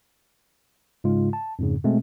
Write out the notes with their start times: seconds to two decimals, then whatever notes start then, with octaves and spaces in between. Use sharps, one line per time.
1.04 G#2 C#3 G#3 F4
1.33 A5
1.59 F2 G#2 C#3
1.84 B2 G#3 A3 C4